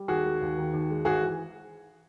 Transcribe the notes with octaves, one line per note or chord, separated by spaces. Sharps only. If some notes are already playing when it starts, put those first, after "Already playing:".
Already playing: G3
D#2 F#4 G#4
G#3
D#2
D#3
D#2
G#3
G#1 F#4 G#4
E3